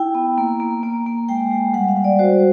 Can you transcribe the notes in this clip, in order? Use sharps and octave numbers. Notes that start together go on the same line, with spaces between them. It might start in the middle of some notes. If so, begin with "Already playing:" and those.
Already playing: E4 G5
B3
A#3
A#3
A#3
A#3
G#3 G5
G#3
G3 F#5
F5
G3
D5
F#4 C5